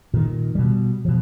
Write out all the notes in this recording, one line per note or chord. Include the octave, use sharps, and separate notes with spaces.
A#2 D#3
B2 G3
B2 F3